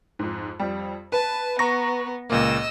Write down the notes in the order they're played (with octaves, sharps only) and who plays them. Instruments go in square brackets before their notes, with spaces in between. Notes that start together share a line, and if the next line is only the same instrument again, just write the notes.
[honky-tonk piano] F2 G#2
F2 G3
[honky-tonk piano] B4 [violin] A5
[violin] B3 [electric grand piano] A#5 C#6 A#6
[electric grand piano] C#2 A#2 A#3 [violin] D#5 E6